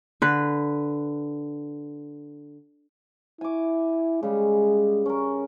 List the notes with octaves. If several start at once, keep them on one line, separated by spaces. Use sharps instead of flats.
D3 B4
E4 G#5 D6
C#3 G3 G#3
C#4 A#4